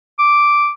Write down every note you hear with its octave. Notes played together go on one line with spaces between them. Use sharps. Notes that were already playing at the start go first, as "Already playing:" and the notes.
D6